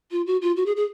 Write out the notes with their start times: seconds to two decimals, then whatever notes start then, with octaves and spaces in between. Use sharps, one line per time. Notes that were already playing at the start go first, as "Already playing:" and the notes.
0.11 F4
0.27 F#4
0.42 F4
0.56 F#4
0.66 G#4
0.76 G#4